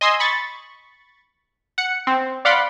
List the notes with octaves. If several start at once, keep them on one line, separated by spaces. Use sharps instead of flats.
D#5 G#5 C6 D#6 E6
B5 C#6 A6
F#5 C#7
C4
D5 F5 F#5 B5 C6 D6